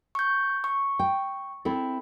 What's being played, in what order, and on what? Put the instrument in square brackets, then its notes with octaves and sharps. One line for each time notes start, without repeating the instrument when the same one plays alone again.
[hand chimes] C#6 G6
C#6
[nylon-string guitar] G5
C4 E4 A4